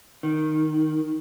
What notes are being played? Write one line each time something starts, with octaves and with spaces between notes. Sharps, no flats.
D#3